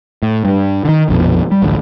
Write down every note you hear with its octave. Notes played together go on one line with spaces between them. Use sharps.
A2
G2
D3 D#3
A#1 F2 B2
G3
A1 D2